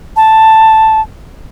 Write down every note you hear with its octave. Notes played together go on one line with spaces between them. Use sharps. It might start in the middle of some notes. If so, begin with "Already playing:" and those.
A5